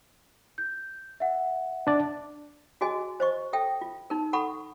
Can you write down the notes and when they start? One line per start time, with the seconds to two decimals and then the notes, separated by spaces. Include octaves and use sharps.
0.58 G6
1.20 E5 F#5
1.87 D4 D5
2.81 F#4 G#4 D#5 G#5
3.20 C5 D#5 C#6
3.53 A4 E5 G5
3.81 F4
4.10 D#4 A#4
4.33 A4 F#5 B5 C#6